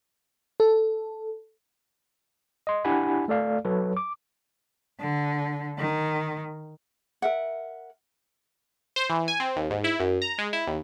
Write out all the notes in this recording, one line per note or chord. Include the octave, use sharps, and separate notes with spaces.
A4
D#5 C6
D4 E4 G4 F#5 G#5 B5
A3 A4 D5 F5
F#3 A4 B4 C#5
D6
D3
D#3
A#4 E5 F#5
C5
E3
G#5
C4
D#2
G#2
E4
F#2
A#5
G#3
E4
D#2